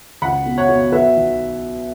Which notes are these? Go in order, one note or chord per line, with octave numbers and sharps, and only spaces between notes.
C#2 F#5 B5
B2
C#5 F#5
B2
F#3 B4 E5
B1